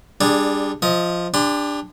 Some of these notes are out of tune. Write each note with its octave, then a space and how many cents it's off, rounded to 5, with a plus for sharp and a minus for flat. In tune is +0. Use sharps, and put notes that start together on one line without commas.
G3 +20 D4 +0 G#4 +0
F3 +0 D#5 +15
D4 +0 G4 +40 C6 -40